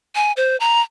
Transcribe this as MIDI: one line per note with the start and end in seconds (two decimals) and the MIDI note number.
0.16 0.32 80
0.37 0.57 72
0.60 0.81 82